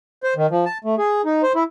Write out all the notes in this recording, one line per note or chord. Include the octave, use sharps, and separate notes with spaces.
C5
D#3
F3
A5
A3
G#4
D#4
C5
E4